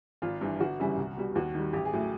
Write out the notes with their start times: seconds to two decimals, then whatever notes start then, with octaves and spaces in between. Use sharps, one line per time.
0.22 G#1 F4
0.41 G2 E3
0.60 G1 F#4
0.79 F#2 C#3 E3 G3
0.97 C2
1.17 B2 G3
1.35 D#2 F#4
1.55 D#3 G3
1.73 A1 G4
1.85 G#4
1.93 A2 F#3